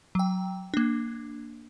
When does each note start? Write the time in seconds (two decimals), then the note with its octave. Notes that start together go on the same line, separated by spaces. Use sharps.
0.15 F#3 G5
0.74 A#3 D4